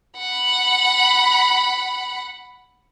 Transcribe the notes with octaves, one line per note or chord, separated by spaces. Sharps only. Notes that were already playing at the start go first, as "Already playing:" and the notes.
F#5 B5